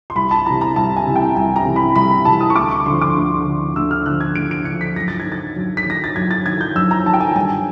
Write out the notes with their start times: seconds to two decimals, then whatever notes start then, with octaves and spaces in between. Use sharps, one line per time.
0.10 C6
0.15 C2 B5
0.31 A5
0.46 C3 E3 A#5
0.61 A#5
0.76 C2 A5
0.96 G#5
1.07 C3 E3
1.16 G5
1.36 C2 G#5
1.56 A#5
1.65 C3 E3
1.76 B5
1.95 C2 B5
2.11 A#5
2.25 C3 E3 A5
2.41 D#6
2.50 C#6
2.56 D2 D6
2.71 C#6
2.86 D3 F3 C6
3.01 D6
3.16 D2
3.46 D3 F3
3.76 D2 E6
3.91 F6
4.06 D3 F3 F#6
4.20 G#6
4.35 D2 D7
4.51 D7
4.65 D3 F3 C#7
4.81 B6
4.96 F#2 A#6
5.08 A6
5.20 G#6
5.25 D#3
5.32 A6
5.56 F#2
5.77 B6
5.86 D#3 A#6
6.04 A6
6.16 F#2 G#6
6.31 A6
6.46 D#3 G#6
6.61 G6
6.75 F#2 E6
6.91 A#5
7.06 D#3 A5
7.14 G5
7.20 G#5
7.36 G2 G#5